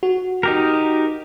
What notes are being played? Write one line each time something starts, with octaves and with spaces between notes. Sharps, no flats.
F#4
D#4 G4 A#4